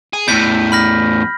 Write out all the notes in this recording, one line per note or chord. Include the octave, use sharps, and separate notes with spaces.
G#4
E2 A2 G6 B6
B5 F6 A#6